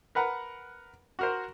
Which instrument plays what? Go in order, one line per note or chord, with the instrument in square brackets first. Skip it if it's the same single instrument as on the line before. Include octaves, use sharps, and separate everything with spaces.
[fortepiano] A#4 B4 F#5 A#5
F#4 A#4 C5